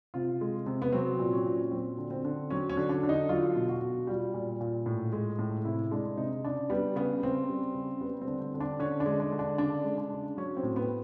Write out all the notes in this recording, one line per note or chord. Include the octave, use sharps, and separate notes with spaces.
C3 F4
G#3
C3
B3
F#3 C4
A#2
C#4
A#2
F#3 C4
D3
C4
D3
F#3 C#4
C#4
D3
D4
D3
D#4
F#3 F4
B2
F#4
B2
G3 F4
A#2
A#2
A2
G#3
A2
C3 E4
G#3 D4
C3 D#4
C#3 D4
G3 B3
C#3 B3
C#3 C4
G3
C#3
G3 B3
C4
D3
C4
D3
D4
D3 C#4
D4
G#3
D4
D3
D4
C#3 D4
G#3
D4
C#3
F#3 C#4
C4
A2
B3